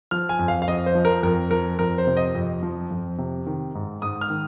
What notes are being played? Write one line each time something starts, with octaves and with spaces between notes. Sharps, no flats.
F3 F6
G#5
F2
F5
F5
F2 D#5
C5
F3
A#4
F2 A#4
F3 A#4
F2 A#4
C5
C3
D#5
F2
F3
F2
C3
D#3
G#2
G#2 D#6
F6
D#3